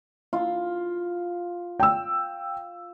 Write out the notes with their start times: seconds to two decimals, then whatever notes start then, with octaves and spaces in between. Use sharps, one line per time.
0.33 F4
1.80 G5 E6